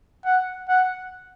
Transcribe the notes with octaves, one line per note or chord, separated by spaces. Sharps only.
F#5
F#5